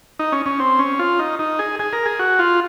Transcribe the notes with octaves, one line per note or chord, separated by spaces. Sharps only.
D#4
C#4
C#4
C4
C#4
F4
D#4
D#4
G#4
G#4
A#4
G#4
F#4
F4